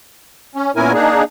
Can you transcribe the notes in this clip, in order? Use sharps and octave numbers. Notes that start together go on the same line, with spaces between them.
C#4
A#2 B3 C#4 E4 A#4 G#5
A#3 D4 D#4 G#4